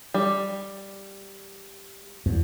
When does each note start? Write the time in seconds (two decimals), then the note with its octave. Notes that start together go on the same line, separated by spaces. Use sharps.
0.14 G3
2.26 E2